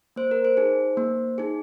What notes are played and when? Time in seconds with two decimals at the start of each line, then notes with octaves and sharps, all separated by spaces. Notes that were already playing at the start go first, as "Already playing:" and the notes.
0.16 A#3 C5
0.31 A#4
0.45 C5
0.57 D#4 G#4
0.97 A#3
1.38 D#4 G#4